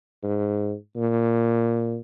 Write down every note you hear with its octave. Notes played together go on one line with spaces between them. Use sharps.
G#2
A#2